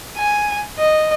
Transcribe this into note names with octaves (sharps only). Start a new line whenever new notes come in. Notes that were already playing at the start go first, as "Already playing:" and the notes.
G#5
D#5